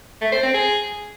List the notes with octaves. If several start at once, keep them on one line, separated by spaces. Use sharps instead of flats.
A3
C5
C4
G#4